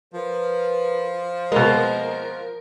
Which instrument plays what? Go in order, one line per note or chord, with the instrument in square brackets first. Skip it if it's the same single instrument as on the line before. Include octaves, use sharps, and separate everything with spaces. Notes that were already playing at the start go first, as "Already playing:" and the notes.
[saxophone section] F3 [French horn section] A#4 B4
[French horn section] F2 A#3 D#5 [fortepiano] B2 G#3 [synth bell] A#4